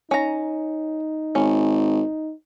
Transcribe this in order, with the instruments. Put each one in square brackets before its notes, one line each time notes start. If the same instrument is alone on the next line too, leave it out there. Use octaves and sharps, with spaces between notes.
[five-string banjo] C#4 A#5 [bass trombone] D#4
[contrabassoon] G#1 [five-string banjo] C#4